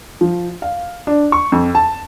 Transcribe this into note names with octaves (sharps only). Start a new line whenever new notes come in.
F3
F5
D4
C#6
F2
A5